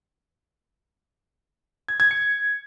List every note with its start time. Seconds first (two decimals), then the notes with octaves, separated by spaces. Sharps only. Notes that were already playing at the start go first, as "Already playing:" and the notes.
1.88 G#6
2.00 G#6
2.11 C#7